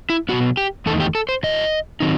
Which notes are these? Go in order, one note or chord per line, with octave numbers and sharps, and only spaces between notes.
E4
B2 F#3 B3 F#4
G4
E2 D#3 A3 D#4 A4
G4
A4
C5
A2 F#3 A3 E4 D#5
D#3 F#3 C4 D#4